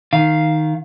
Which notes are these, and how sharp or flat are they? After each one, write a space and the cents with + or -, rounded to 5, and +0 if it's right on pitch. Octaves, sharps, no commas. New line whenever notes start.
D#3 +0 F5 +0